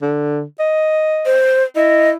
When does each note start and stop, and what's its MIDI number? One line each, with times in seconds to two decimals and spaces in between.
0.02 0.43 50
0.60 1.40 75
1.26 1.64 72
1.76 2.17 64
1.76 2.10 75